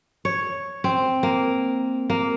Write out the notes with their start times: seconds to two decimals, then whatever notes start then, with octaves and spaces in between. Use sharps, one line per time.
0.25 C#5
0.84 C4
1.23 A#3
2.10 A#3